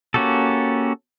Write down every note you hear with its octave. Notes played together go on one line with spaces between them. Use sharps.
A#3 C#4 F#4 G4 A4